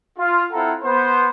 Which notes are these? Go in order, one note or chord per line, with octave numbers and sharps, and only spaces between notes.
F4
C4 E4 F4 A4 F#5 A#5
B3 C5